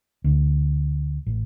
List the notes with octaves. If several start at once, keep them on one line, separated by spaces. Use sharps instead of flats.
D2
A1